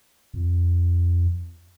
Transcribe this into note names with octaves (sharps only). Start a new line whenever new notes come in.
F2